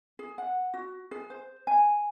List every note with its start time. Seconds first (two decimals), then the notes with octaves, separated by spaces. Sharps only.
0.19 G#4
0.38 F#5
0.74 F#4
1.11 G#4
1.30 C5
1.67 G#5